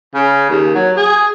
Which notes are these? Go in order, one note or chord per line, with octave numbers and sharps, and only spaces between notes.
C#3
D#2
F#3
G#4